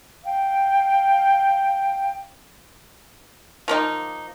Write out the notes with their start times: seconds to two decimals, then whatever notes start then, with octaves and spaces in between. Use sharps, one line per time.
0.24 F5 G5
3.68 F3 A#3 D#4